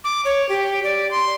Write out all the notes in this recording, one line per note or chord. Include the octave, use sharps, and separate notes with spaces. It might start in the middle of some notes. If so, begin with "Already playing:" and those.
D6
C#5
G4
D5
C6